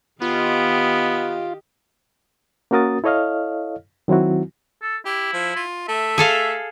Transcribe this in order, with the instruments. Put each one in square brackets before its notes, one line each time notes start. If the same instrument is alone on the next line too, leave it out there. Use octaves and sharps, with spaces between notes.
[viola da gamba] D#3 G4 D#5 [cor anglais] B3 [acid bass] F4
[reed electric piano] A#3 C#4 F#4 A#4 D#6 A6
E4 A4 C#5 D#5 F5 F6
D#3 F#3 C4 E4 F#4
[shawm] A4
[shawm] E4 [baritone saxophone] G4
[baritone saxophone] F3
F4
[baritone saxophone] A3 [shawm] E5
[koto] G#4 A4 F5